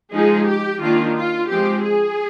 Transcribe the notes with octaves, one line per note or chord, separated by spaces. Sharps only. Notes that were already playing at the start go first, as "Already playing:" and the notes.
F3 G#3 D#4 G#4
G4
D#3 A#3 D4 F4
F4
F3 G#3 C4 G4
G#4